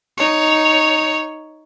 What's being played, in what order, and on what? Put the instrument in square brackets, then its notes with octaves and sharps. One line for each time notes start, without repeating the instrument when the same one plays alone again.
[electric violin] D#4 C#5